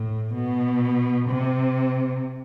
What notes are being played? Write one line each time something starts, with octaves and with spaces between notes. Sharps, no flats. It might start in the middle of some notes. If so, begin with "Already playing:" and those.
Already playing: A2
B2
C3